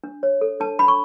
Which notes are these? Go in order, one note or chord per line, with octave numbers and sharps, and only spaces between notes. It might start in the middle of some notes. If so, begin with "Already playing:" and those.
D4
C#5
A4
D4 A5
D4 B5
C#6